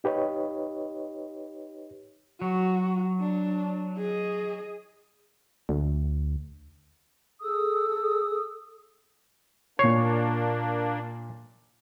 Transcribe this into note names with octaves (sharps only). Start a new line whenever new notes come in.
D#4 G4 B4 C#5 D#5
F#3 F#4
D4
G#4 D#5
D2
G#4 A4 D#6 E6
A#2 A#3 D4 C#5 C7